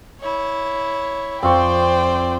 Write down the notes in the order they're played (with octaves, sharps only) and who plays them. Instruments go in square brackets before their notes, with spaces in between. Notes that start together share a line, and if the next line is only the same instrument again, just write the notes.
[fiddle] E4 C#5
[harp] F2 [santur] C4 F4 C#6 [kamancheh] C5 G5 [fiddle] D5